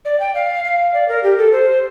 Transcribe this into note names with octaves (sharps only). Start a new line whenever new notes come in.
D5
G5
F5
F5
D5
A#4
G4
A4
C5